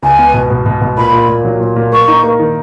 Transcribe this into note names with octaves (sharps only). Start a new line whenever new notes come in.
C#2 G#5
B3
B2
B2
B2
B2
A#2 B5
A#2
A#2
F#3
A#2
A#2
A#3 C#6
D#4
A#3
D#3